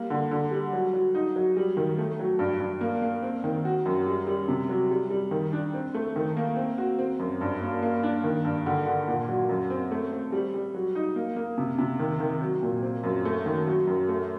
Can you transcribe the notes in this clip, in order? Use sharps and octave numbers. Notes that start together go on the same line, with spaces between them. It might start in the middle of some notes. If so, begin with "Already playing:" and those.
Already playing: G3 A#3
D3
D3
G3
F#3
F#3
D#4
F#3
G3
D#3
A3
F#3
G2
G2
A#3
A#3
C4
D#3
F#4
F#2
G3
G3
C3
F#3
G3
G3
D#3
D4
C4
A3
D#3
A#3
C4
F#4
C4
F#2
G2
A#3
A#3
D4
D#3
G2
D3
D3
A#2
F#3
F#2
C4
A3
C4
G3
G3
F#3
D#4
A#3
A#3
C3
C3
D#3
D#3
F#3
A#2
C4
F#2
A3
D#3
F#3
F#2
A3